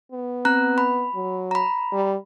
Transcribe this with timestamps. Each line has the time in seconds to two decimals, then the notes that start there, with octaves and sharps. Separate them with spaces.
0.12 B3
0.45 C4 A#5 F#6
0.78 B5
1.15 F#3
1.51 A#5 B5
1.93 G3